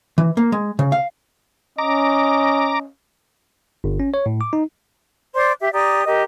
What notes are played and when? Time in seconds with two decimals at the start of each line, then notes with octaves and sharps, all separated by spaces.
0.18 E3
0.37 A#3
0.52 G#3
0.79 C#3
0.92 F5
1.78 C#4 D#5 A#5 D6
3.84 G1
4.00 C#4
4.14 C#5
4.26 A2
4.41 D6
4.53 D#4
5.36 C5 D5 C6 D6
5.60 G4 E5
5.74 G4 D5 A#5 D#6
6.06 G4 A#4 D#5